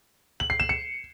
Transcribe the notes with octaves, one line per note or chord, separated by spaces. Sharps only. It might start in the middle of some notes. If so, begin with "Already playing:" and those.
F#7
C7
E7
C#7